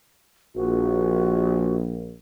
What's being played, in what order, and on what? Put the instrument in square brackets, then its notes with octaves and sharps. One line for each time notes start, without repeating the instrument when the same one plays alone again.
[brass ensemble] A#1 [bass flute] F#4